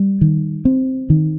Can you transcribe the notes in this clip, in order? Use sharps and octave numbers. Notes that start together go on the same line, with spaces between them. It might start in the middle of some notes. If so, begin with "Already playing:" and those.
Already playing: G3
D#3
C4
D#3